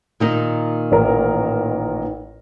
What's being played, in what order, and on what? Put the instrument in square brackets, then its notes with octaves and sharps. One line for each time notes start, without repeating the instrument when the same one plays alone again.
[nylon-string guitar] A#2 D#3 D#4
[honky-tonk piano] A1 A#4